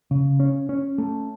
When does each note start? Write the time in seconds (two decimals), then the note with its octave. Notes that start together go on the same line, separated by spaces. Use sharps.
0.11 C#3
0.40 C#4
0.69 C#4
0.98 A3